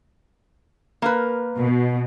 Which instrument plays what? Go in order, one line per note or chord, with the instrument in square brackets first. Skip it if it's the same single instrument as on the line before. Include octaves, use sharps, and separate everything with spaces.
[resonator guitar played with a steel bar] A#3 A#4 B4
[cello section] B2